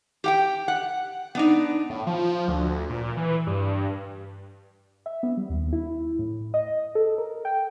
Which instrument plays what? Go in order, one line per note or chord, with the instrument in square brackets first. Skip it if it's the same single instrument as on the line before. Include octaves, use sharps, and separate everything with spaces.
[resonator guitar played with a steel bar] G4 F#5 G5
F#5
B3 D4 D#4
[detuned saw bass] A2
F3
D2
A#2
E3
G2
[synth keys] E5
B3
G3
D#2
E4
A2
D#5
A4
A#4
G5